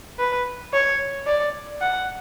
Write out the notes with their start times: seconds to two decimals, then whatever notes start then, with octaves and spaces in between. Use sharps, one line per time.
0.19 B4
0.73 C#5
1.26 D5
1.81 F#5